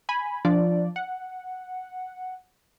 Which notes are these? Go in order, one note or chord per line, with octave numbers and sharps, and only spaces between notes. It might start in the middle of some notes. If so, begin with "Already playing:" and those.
G#5 B5
F3 D4 D5
F#5